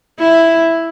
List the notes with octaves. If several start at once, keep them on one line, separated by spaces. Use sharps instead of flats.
E4